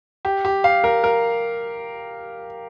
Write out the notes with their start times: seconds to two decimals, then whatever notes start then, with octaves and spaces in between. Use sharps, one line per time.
0.25 G4
0.45 G4
0.64 F5
0.84 A#4
1.04 A#4